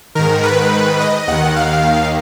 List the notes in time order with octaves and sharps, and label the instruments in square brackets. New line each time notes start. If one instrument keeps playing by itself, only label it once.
[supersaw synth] G#2 D#3 A#4
B4
D#5
D#2 D#3 F#5
F5